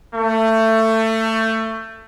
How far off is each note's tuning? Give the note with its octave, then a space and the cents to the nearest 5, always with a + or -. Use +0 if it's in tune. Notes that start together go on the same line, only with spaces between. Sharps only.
A3 +20